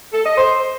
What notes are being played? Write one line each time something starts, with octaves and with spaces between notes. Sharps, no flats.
A4
D#5
C5